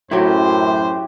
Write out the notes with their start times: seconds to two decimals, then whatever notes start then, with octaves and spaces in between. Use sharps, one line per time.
0.11 F#2 A2 F#3 E4 G4 C5 C#5